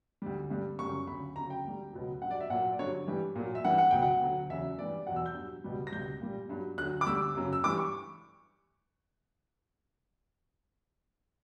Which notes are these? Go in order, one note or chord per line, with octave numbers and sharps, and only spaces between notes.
D2 D3 G3
G2 D3 G3
F#2 C#3 G3 C#6
D2 C#3 F#3 B5
D2 C#3 F#3 A#5
G5
D2 D3 G3
C#2 B2 F#3
G2 F#3 D5 F#5
E5
A#2 F#3 F#5
D5
G2 D3 F#3 C#5
G2 E3 G3
A#2 F#3
E5
G2 E3 G3 F#5
F#5
C#2 B2 F#3 G5
F#5
D2 D3 F#3
E2 C#3 F#3 E5
G2 E3 G3 D5
E2 B2 F#3 F#5
E6
G6
G2 F#3
C#2 B2 G3
A#6
C#2 B2 G3 G6
A#2 G3
G2 F#3
D2 D3 F#3 F#6
D6
D2 D3 G3 E6
F#2 C#3 F#3
E6
G2 E3 G3 D6
C#6